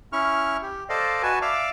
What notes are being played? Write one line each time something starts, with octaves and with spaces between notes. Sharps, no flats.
C#4 E4 C#6 F6
G4
A4 C5 D5 D#5 F5
F#4 B4 G#5 A5
D5 E5 F5 D6 F6